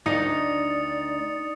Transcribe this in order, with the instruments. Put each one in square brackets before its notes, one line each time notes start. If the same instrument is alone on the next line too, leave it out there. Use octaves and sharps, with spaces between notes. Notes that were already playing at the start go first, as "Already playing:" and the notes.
[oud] D2 D#3 D4 [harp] D#4 [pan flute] D5 [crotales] D#6 C#7